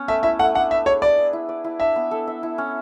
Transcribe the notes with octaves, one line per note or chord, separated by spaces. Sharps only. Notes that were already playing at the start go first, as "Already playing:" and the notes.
Already playing: B3 C#4
A3 E5
E4 E5
A3 F#5
D4 F#5
B3 E5
G#4 C#5
B4 D5
G#4
E4
D5
E4
D4 E5
B3
A4
E5
E4
C#4